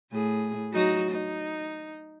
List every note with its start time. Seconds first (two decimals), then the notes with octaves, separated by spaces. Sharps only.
0.11 A2 G#4
0.72 F#3 D#4 F#4
1.10 D#4